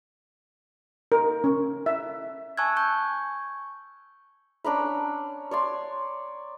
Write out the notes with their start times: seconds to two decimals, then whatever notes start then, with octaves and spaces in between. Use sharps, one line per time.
1.12 A#4
1.44 C#4
1.86 E5
2.57 G#5 A5 C#6 E6 F#6 G#6
2.77 C#6 G6
4.64 C#4 D4 A#5 B5
5.51 C#5 D5 C6